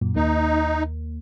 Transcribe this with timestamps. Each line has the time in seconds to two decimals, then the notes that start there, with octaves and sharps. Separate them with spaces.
0.01 F#2 A#2
0.16 D#2 A#3 D#4